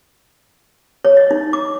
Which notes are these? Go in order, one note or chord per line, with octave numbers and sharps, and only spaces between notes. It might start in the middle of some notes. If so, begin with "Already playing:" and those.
C#5
D#5
D#4
D6